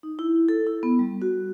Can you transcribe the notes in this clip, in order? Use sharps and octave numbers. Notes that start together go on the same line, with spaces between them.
D#4
E4
A4
E4
B3
G3
F#4